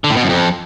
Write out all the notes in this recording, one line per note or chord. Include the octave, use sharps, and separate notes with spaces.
D3
A2
B2
F#2
F2